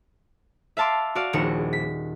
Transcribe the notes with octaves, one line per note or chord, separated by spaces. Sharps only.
E5 F5 A5 C6 D6
F#4 D5 F5
D#1 A#1 D#4 G#4 C#7 E7
B6